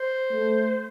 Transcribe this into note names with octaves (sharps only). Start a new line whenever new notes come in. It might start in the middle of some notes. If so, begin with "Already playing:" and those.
Already playing: C5
A3